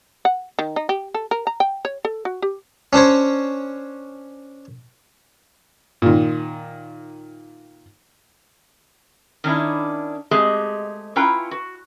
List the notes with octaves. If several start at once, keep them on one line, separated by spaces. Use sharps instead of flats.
F#5
D#3
D#4
G4
A4
A#4
A#5
G5
C#5
A4
F#4
G4
C#4 D4 C5 C#5
A#2 D#3
D#3 C#4 D4 E4
G#3 A3 C4 G4 G#4 D#5
C#4 E4 F4 B4 G5 A#5
F#4